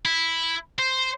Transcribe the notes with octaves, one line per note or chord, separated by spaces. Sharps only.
E4
C5